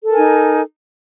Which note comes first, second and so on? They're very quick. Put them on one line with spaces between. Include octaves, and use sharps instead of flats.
A4 A#4 G#5 D#4